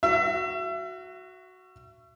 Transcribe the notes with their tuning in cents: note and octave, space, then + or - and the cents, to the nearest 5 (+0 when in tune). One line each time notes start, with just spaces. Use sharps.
F#4 +0 E5 +35